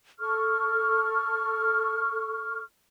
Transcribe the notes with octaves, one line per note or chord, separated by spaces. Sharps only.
A4 C#6 F6